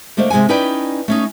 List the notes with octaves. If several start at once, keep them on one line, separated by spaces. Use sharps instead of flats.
D3 A3 A#3 C5 D#5
C3 G#3 A#3 F#5 G#5
C#4 D#4 E4 B4 D5 G5
A3 C#4 D#4